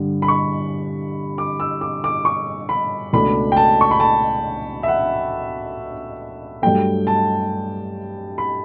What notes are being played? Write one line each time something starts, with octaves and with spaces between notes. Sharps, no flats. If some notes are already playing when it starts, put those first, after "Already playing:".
Already playing: G2 D3 G3
B5
C#6
D6
E6
D6
D6
C#6
B5
C#2 B2 A3 D4 B5
G5
A5
C#6
B5
A5
E5
F#5
G2 F#3 A3 G5
A5
B5